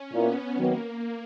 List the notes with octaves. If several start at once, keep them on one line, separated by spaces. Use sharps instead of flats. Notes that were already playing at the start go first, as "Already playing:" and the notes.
Already playing: C#4
A#2 A#3 B3 E4
D#3 F#3 A#3 B3